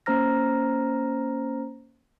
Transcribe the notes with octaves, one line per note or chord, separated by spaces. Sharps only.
A#3 C#4 C5 A#5 F6 A#6